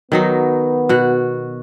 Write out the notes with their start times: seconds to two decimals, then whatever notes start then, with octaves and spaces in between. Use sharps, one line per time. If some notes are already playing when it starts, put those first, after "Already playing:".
0.12 D#3 F#3 B3 D#4
0.89 B2 F#4